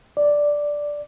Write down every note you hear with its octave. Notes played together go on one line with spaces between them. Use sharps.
D5